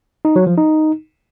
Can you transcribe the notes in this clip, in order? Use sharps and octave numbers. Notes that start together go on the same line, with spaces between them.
D#4
F#3
F3
D#4